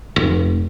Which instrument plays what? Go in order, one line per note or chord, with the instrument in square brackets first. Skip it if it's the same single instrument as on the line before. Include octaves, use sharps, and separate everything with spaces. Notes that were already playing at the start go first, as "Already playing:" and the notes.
[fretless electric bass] F1